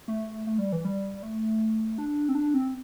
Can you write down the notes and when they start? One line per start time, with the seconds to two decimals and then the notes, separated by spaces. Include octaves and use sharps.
0.08 A3
0.47 A3
0.59 G3
0.72 E3
0.85 G3
1.23 A3
1.98 D4
2.29 C4
2.35 D4
2.54 C4